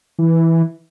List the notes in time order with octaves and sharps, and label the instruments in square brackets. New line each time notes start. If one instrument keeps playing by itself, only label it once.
[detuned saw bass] E3